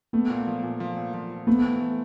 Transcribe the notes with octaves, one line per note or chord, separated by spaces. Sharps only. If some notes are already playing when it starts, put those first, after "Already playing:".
A3 B3
A#2
F3
A#2
F3
A#2
F3
F3
A3 B3
E3
A3